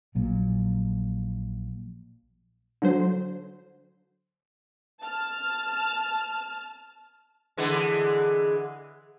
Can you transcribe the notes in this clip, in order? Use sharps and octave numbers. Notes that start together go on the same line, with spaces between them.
A#1 A#2 F#3
D3 F#3 C5
A5 F6
D3 E3 G#3